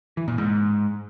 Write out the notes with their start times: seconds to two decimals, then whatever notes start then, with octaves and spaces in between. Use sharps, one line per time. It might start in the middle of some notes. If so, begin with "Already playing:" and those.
0.17 E3
0.28 A#2
0.38 G#2